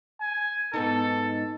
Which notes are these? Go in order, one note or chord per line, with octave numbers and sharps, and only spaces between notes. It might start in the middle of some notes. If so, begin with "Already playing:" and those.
G#5
G#2 B3 D#4 A4